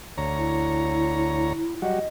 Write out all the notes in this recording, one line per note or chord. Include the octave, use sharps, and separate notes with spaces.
D2 C#5 A#5
E4
F#3 G3 F#4 D#5